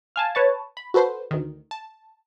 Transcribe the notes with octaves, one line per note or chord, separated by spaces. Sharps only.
F5 G#5 A5
B4 C#5 A5
B5
F#4 A4 B4 C5
D2 D#3
A5